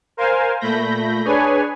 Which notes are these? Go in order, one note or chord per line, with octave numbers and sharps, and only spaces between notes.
A#4 C5 F5 G#5
A#2 A3 B5 G6 A#6
D4 G#4 B4 C#5 G#5